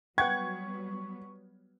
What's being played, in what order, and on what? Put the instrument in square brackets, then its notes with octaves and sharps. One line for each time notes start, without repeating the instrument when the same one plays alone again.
[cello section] F#3 G3 B3 [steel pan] B4 F#5 G5 [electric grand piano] C#6 [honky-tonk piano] G#6